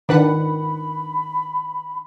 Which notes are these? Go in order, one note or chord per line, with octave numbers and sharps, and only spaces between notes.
D#3 D4 B4 F#5 B5